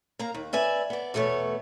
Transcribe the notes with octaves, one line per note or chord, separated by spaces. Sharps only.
A#3 F5 A#5
D#2
B4 D5 E5 G#5
B3 D5
E2 B2 A3 B3 C#5